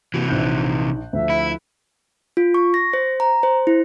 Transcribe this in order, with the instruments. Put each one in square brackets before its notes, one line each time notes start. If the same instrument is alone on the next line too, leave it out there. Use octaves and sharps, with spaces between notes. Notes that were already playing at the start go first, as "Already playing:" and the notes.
[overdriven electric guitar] C3 E3 [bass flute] A#3 [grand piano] F#4
[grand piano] A#1 F#6 G6 [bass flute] D#4
[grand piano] D2 F3 [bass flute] E5
[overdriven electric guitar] E4
[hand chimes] F4
C#6
A#6
C5
A#5
C5
E4